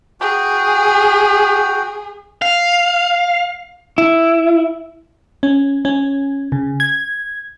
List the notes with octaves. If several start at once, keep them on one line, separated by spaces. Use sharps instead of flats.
F#4 G#4 G5
F5
E4
C#4
C#4
C#3
G#6